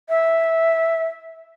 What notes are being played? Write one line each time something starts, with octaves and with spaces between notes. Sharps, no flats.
E5